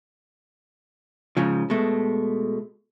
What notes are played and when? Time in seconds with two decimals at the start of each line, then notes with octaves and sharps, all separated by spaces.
1.37 G#2 C#3 F3
1.70 B2 G#3 A3